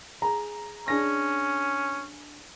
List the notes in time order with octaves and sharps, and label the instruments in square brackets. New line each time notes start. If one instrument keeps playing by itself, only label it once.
[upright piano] G#4 A#5
[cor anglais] C#4 [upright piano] D4 G#4 A#6